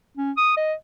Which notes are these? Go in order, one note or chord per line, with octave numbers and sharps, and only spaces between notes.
C#4
D#6
D#5